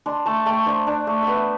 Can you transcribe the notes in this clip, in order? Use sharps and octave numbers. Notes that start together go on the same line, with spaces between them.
D4 C6
A3 A5
A3 G5
D4 C5
D4
A3
B3 D5 E5